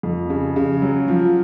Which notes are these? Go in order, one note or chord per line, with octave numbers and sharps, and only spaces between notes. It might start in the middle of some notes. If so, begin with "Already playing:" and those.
F2
C#3
C#3
F#3
F3